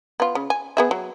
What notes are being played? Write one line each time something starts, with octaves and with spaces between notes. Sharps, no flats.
B3 F4
C#3
G#5
B3 G#4 E5
F#3